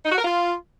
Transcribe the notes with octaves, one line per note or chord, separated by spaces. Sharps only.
D#4
F#4
A#4
F4